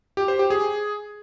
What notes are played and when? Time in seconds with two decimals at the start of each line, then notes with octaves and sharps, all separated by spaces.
0.17 G4
0.28 C5
0.39 G4
0.50 G#4